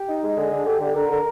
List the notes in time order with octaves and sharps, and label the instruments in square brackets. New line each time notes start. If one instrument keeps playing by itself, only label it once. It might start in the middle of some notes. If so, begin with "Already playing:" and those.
Already playing: [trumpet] G4
[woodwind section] D#4
G#3
[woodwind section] D3 [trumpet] G#4
[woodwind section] D3
[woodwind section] D3 [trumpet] G4
[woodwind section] D3
[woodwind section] D3 [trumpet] A#4
[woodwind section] D3